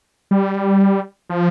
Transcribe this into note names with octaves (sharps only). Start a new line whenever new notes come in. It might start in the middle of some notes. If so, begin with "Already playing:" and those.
G3
F3